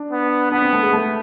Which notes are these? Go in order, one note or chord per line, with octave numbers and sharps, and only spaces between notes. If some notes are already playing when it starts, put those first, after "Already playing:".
Already playing: D4
B3
B3 D4
C4
A3
G#3
A3